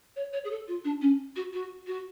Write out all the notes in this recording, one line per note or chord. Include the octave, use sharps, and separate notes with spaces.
C#5
C#5
G#4
A4
F4
D4
C#4
F#4
F#4
F#4